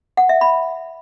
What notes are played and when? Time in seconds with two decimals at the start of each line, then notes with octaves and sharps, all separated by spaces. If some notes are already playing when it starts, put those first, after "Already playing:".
0.17 F#5
0.29 E5
0.41 B5